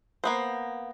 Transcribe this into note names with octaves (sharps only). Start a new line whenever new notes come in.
A#3 B3 C5